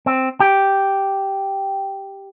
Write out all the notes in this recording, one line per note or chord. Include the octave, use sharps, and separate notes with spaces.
C4
G4